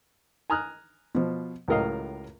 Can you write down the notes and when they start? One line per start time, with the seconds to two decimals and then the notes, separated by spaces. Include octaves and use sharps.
0.50 G#5 A#5 D#6 F6 F#6
1.15 B2 F3
1.68 C#2 A2 F#3 A#4 D#5 F5